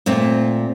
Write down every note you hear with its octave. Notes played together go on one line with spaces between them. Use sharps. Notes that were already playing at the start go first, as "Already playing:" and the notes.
A#2 A3 C4